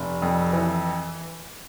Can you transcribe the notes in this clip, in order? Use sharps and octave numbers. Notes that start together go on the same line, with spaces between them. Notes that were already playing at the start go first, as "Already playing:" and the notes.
Already playing: F1
F2
E3